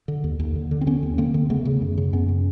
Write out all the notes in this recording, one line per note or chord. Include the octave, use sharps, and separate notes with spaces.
D3
D#2
D#2
D3
D3
C4
D3 B3 C#4
D#2
D3 A#3 C4
D3
C#3 A3 B3
C#3
F#2
C#3
F#2 B3 C#4
C#3